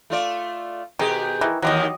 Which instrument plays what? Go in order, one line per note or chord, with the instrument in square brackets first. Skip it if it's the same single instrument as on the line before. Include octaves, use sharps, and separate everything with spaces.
[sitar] A3 F4 D5
[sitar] B2 G4 G#4 [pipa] D#3
[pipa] D#3 E3
[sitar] D#2 D#3 E3 [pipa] F#3 G4 D#5